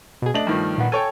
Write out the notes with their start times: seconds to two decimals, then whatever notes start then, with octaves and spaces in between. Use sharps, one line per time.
0.22 B2 G#4
0.34 A3 D4 D#5 F#7
0.47 G2 D#3 F3
0.78 A#2 B3
0.92 A4 C#5 G5 G#5